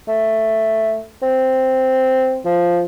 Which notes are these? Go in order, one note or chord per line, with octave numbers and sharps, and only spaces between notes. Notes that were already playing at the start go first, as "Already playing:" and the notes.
A3
C4
F3